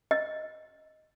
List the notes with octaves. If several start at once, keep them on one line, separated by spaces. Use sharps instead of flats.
D#5